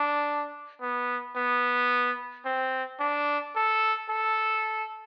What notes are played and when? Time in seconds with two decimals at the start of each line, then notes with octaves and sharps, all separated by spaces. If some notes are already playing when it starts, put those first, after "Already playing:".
Already playing: D4
0.81 B3
1.36 B3
2.45 C4
3.00 D4
3.55 A4
4.10 A4